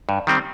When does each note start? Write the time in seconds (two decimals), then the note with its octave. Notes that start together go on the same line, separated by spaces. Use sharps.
0.09 G2
0.27 D#3 G3 C4